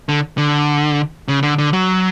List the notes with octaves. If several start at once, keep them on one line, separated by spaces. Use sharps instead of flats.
D3
D3
C#3
D3
D3
F#3